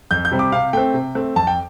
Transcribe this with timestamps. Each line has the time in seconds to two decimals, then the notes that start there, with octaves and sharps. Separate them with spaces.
0.11 F2 G6
0.25 G6
0.31 C3 G3 C4
0.39 D6
0.52 C3 F5
0.73 A3 C4 G5
0.94 C3
1.15 A3 C4
1.36 F2 A5
1.47 G5